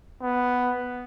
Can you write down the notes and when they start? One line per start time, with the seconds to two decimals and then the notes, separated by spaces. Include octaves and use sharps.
0.22 B3